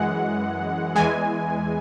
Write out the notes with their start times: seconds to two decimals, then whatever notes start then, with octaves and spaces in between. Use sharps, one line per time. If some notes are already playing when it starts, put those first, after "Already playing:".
Already playing: F#2 E3 G#3 F#5
0.96 E2 E3 G#3 G#5